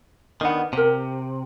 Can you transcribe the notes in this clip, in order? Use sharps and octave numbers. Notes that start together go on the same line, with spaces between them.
D#3 B3 D4 D#5 F#5
C3 G4 A#4